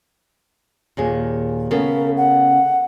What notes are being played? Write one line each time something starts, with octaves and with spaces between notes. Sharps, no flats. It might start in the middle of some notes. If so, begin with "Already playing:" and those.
D#2 A#2 G#4
C#3 A3 B3 A#4
F#5